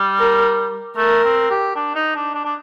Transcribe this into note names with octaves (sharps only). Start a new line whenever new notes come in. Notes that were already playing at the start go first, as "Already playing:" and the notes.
Already playing: G3
A#4
A3 A#4
C4
G4
D4
D#4
D4
D4
D4